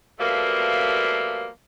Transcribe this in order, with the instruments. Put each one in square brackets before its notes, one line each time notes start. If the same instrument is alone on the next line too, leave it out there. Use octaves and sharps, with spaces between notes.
[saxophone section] B2 F3 G3 A3 A#3